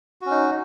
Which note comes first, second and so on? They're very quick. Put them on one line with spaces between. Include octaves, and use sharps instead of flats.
F#4 C#4 D#4